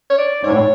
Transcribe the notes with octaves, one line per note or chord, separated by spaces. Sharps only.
C#5
D5
G#2 C#5
A2